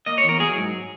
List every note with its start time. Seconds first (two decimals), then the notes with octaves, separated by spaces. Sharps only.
0.06 A#3 D#5
0.18 C#5
0.24 E2
0.29 A#4
0.39 F#3 G#4
0.57 G#2